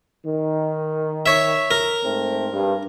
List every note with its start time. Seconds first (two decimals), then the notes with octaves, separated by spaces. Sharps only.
0.26 D#3
1.26 C#5 E5
1.71 A#4
2.03 G#2 A3 C4
2.52 G2